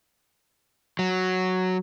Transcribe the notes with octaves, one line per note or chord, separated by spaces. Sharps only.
F#3